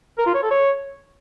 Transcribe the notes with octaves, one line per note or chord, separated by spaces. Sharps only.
A#4
F4
C#5
A4
C#5